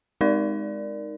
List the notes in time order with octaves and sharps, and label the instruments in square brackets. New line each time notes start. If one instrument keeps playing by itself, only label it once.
[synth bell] G#3 D#4 A#4 D5